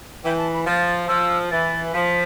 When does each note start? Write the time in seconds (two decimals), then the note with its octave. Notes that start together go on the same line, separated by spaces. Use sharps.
0.24 E3 G5
0.38 A5
0.52 B5
0.66 F3 A6
1.08 F3 E6
1.51 E3 A6
1.94 F3 B6